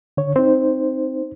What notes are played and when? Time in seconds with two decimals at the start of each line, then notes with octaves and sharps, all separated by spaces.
0.17 D3 C#5
0.36 C4 D#4 C5